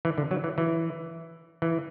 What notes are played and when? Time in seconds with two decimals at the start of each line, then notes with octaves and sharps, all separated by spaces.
0.05 E3
0.18 D3
0.31 F#3
0.44 E3
0.58 E3
1.62 E3